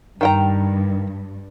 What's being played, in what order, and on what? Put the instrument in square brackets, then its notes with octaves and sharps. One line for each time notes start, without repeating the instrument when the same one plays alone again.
[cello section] G2 [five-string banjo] D#3 G5 A#5